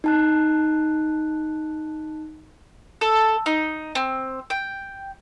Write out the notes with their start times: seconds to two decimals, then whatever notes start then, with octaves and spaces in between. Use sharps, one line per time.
0.04 D#4 A5 F#6
3.01 A4
3.46 D#4
3.95 C4
4.50 G5